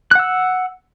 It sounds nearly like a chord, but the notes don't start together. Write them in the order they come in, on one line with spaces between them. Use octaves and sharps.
F#6 F#5 E6